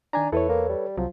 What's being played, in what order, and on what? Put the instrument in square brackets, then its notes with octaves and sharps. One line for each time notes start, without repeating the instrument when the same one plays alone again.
[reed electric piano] D#3 G#5 A#5 [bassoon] D4
[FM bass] E2 [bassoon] E4 [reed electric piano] A4 B4 C#5
[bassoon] A#3
G3
[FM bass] C2 [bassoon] F3 [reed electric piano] F#3